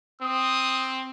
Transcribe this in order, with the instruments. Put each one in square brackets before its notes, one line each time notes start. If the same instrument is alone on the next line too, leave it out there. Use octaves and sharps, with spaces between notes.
[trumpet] C4 [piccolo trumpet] D#6